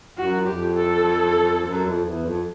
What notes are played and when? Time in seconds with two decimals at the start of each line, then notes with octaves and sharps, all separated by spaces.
0.17 F#2 F#4
0.47 F2 G4
0.77 A4
1.66 F#2
1.86 F2
2.06 E2
2.25 F2